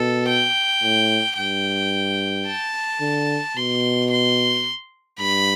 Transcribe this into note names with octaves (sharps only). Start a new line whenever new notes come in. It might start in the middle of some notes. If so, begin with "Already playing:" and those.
Already playing: B2 A4
G5
A2
G2 G5
A5
D3
B2 C6
C6
G2 B5